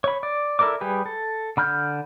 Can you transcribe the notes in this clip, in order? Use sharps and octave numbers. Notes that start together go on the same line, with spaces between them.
C#5 B5
D5
E4 A4 A#4 D5 D6
G3 G4 G#4 B4
A4
D3 B5 F6 G6